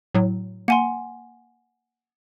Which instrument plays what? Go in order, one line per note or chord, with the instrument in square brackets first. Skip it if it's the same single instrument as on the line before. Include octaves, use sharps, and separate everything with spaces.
[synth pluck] A2 F#3
[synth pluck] A#3 [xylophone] F#5 G#5 C6